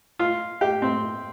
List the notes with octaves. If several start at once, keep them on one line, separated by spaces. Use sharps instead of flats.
F4
G4
C4